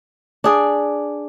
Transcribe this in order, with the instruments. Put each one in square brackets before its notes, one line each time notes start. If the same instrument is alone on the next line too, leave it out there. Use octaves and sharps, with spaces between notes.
[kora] D4 G#4 D5